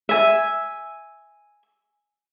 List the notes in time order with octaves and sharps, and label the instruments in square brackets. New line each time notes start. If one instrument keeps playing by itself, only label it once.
[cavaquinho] E5 G#5